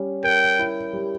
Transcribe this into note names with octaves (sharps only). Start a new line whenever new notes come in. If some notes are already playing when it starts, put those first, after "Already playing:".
Already playing: G3 C#4
A#4 G5
E4
G3